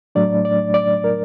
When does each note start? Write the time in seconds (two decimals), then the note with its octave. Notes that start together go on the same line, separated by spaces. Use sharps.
0.15 A2 F#3 A3 D4 D5
0.45 D5
0.74 D5
1.04 A#4